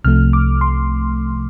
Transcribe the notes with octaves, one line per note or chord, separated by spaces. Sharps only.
C2 C3 F3 A3 F6
D6
C6